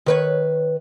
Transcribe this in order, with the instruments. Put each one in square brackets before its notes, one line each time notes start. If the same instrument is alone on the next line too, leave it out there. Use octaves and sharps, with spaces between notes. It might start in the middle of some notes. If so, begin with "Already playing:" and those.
[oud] D#3 B4 C#5